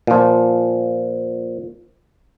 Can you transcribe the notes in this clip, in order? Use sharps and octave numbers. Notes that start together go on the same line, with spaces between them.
A#2 F3